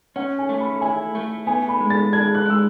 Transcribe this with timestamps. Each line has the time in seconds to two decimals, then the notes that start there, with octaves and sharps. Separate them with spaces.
0.16 C#4 F#5
0.39 G#5
0.49 A3
0.60 B5
0.81 E4 G#5
1.15 A3
1.47 B3 G#5
1.69 B5
1.80 G#3
1.90 A6
2.13 D4 G#6
2.35 F#6
2.45 G#3 E6